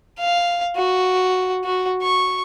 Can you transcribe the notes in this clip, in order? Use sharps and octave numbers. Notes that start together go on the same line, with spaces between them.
F5
F#4
F#4
C#6